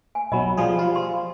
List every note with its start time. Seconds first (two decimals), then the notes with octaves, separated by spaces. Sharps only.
0.15 G#5
0.32 B1 F#3 D#5 B5
0.57 F3 G3 G#4
0.79 F3 F4
0.96 C6